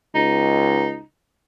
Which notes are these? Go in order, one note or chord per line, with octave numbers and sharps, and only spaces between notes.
C#2 D#4